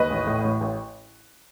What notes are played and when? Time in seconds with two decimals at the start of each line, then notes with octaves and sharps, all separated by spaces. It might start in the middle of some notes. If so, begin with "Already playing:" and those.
Already playing: D#2 B4 D#5
0.10 A1
0.27 A2
0.44 A1
0.61 A1